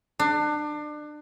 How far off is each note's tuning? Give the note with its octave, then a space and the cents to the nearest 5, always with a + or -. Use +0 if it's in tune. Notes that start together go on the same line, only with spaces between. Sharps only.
D4 +30